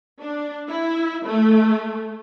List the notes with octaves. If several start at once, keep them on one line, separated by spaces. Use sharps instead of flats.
D4
E4
A3